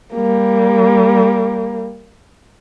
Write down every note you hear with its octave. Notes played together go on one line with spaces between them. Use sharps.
G3 A#3